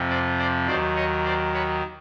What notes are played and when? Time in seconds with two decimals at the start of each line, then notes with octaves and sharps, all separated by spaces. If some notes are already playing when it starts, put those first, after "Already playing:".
Already playing: F2 C3 F3
0.09 C5 D5
0.39 C5 D5
0.67 D#2 D#3 F#3 C5 D5
0.95 C#5 D#5
1.25 C5 D5
1.53 B4 C#5